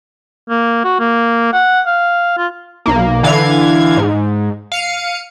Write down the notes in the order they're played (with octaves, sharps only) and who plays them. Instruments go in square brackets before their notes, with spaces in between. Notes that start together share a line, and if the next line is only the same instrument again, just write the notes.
[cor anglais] A#3
F#4
A#3
F#5
F5
F4
[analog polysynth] B1 A#3
D3 E3 F5 G#6
G#2
F5 C#7 D#7